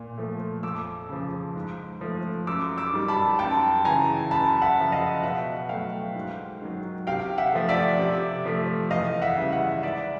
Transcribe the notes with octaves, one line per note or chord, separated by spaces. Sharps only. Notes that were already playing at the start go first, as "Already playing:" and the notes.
Already playing: A#2
F3 A3
F2 D6 E6
C#3 F3
G#2
F3 A3
F#2 D6 E6
D6 E6
D#3 G3
A5 B5
F#2 G5 A5
C#3 E3 G#5 A#5
F#2 A5 B5
E5 F#5
C#3 F3
D#5 F5
B2 E5 F#5
F#3 A3 F5 G5
G#2
D#3 F#3
C3 F5 G5
E5 F#5
F3 A3
D5 E5
C3
F3 A3
E2 D#5 F5
E5 F#5
C#3 E3 G3
E5 F#5
G#2 D5 E5